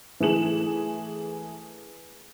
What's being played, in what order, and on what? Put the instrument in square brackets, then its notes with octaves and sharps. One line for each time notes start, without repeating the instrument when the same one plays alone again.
[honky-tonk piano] E3 A3 G#4 E7 F#7